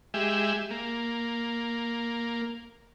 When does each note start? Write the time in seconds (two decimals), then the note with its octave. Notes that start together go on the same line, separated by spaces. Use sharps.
0.14 G#3 G4 E5
0.71 A#3